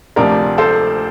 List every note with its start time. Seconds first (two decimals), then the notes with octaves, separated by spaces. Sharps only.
0.16 D2 C3 F3 A#4 D5
0.58 A4 C5